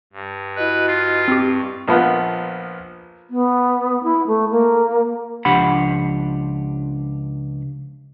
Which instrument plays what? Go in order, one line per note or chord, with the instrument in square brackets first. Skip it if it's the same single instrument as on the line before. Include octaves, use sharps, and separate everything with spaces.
[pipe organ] G2
[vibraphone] E4 F#4 D#5 [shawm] B4
[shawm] F4
[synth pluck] C4 G4 [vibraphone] C#6
[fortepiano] A#1 F3 B3
[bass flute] B3
E4
A3
A#3
[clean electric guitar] C#2 F3 D4 G4 F#5 B5